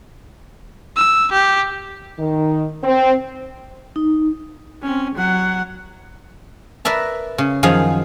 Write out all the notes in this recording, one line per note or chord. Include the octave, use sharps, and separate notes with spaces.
E6
G4
D#3
C4
D#4
C4 C#4
F#3 F#5
A#4 B4 D5 E5 A5
C#3
F#2 D#3 F3 G#4 F5 G#5